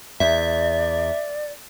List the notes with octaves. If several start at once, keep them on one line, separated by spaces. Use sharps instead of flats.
E2 D5 E5